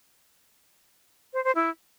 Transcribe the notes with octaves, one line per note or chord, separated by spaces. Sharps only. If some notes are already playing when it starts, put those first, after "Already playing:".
C5
C5
E4